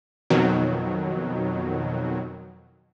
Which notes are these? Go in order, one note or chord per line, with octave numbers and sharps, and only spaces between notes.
F2 B2 D#3 F#3